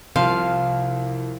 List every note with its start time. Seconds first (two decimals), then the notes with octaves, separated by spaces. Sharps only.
0.16 C2 C3 F3 F4 F5